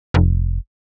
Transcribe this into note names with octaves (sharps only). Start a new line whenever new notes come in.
F1